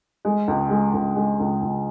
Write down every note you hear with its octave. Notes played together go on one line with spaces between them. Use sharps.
G#3
C#2
G#3
C#2
G#3
C#2
C#2